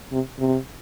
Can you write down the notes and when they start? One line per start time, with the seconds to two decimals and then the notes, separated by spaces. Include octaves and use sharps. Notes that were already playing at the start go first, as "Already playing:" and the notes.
0.12 C3
0.39 C3